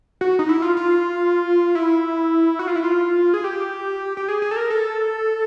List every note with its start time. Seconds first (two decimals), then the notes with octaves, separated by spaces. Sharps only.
0.21 F#4
0.39 D#4
0.49 E4
0.62 F4
0.77 F4
1.75 E4
2.59 F#4
2.68 F4
2.75 E4
2.84 F4
3.34 G#4
3.44 G4
4.17 G4
4.28 G#4
4.42 G#4
4.51 A4
4.56 A#4
4.70 A4